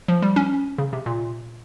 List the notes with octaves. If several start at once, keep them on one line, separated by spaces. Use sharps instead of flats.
F3
G3
C#4
C#3
C3
A#2